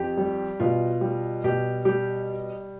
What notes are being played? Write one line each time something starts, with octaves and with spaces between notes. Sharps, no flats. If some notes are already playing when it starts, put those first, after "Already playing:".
Already playing: F2 G4
G3
B2 F4
G3
B2 G4
G3 G4